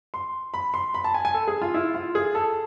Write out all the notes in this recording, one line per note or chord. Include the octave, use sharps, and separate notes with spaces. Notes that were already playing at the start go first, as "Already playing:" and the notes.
C6
B5
C6
B5
A5
G#5
G#5
A4
G#4
F4
E4
F4
G#4
A4